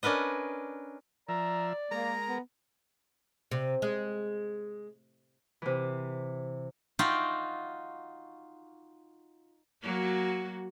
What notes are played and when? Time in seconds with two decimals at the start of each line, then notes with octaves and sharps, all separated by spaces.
0.03 C#4 D4 A#4 B4 D#5
1.29 F3 D5 E5 A#5
1.91 G#3 A#3 A#4 A#5
2.28 B3
3.51 C3
3.82 G#3
5.62 C3 E3
6.99 D#4 F4 F#4 E5 G5
9.82 F#3 A#3 F#4